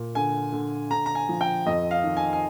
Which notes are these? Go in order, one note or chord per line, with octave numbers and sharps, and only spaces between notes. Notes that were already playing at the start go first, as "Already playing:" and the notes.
Already playing: A#2
D3 G#5
D3
D3 A#5
A#5
G#5
F3
G5
F2 D#5
F5
D#3
G#5
G#5